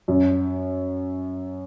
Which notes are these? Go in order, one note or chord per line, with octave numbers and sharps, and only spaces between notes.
F#2